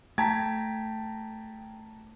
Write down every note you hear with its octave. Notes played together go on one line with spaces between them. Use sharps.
A3 G5 A5 A#5 G#6 B6